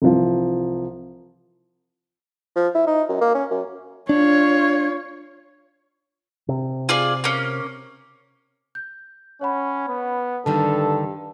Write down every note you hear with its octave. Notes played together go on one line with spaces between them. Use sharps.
C2 E3 F3
F3
E4
D#4
F#2
A#3
C#4
F#2
D4 F4 C#5
C3
F4 G#4 D5
A#3 C#4
G6
C#4 C#5 F#5 B5
B3
G2 D3 D#3 G3 A4 A5